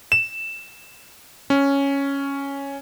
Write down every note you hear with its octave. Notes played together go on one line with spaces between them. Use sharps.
E7
C#4